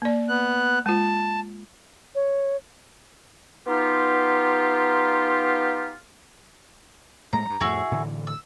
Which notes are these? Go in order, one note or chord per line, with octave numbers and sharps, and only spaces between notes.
A#3 D5
B3 F#6
G#3 F4 A5
C#5
B3 D#4 F4 G4
A2 G#3 A#3 A#5
G2 G3
F2 A2 E4 F#4 G#4
A2 D3 E3
E6